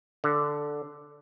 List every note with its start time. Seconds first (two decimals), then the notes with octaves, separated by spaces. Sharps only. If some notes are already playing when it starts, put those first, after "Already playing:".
0.24 D3